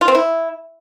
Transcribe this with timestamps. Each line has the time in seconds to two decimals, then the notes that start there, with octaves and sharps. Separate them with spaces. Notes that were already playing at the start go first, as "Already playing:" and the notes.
0.01 F4
0.08 C4
0.15 E4